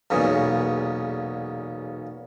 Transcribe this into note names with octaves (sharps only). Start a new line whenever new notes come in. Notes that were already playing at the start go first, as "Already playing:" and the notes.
B1 E2 A#2 C#3